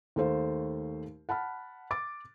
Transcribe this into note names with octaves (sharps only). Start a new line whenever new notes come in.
D#2 A3 C5 F5
F#5 A5 B5 F6
D6 A6